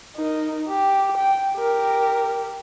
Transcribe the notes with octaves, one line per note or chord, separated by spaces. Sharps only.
D#4 A#4
G4
G5
G4 A#4